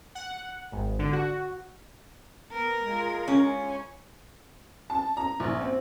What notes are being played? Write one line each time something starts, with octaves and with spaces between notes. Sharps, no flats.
F#5
G#1
D3
F#4
B3 A#4
G#3 F4 G#4
C#4
A5
A#5
A#1
C4